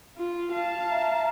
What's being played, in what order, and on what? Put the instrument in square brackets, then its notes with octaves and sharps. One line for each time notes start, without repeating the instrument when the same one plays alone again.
[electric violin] F4
F5 A5
[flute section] E5 A#5